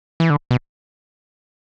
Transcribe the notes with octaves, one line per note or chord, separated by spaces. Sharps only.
E3
D3
B2